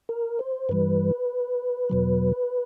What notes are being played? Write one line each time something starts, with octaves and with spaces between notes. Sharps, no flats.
A#4
C5
G2 E3 G3 B4
E2 B2 F#3